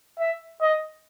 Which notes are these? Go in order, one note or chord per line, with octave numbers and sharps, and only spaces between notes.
E5
D#5